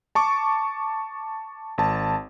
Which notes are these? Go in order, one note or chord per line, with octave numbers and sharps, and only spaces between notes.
A5 C#6 D6
G#1 A5